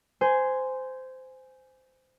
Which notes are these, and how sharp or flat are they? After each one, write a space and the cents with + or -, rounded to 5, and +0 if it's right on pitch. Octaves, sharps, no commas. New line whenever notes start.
C5 -15 G#5 +0